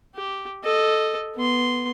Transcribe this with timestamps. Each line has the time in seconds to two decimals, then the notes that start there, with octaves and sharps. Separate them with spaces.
0.16 G4
0.64 A4 D#5
1.36 B3 C6